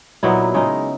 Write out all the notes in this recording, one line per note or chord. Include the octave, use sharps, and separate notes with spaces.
A#2 F#3 B3 D#4 E4
C#3 G#3 D#4